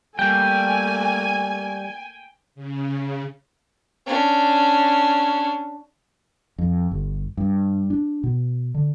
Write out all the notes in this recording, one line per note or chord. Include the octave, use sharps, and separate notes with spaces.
G3 A3 A#3 G5 G#5
C#3
C#4 D4
F2
G1
G2
D4
B2
D3